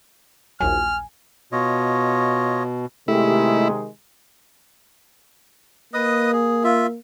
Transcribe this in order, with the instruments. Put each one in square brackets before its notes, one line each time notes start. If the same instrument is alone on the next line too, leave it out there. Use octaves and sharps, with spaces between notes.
[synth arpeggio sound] A#1 D#2 F#3 [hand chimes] G#5 [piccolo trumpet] F6
[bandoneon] B2 [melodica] F4 C#5 D#5
[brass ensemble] C3 D#3 G#3 [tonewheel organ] A3 G4 [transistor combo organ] E4
[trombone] A#3 [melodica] B4 D#5 D#6
[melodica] G#4
F4 E5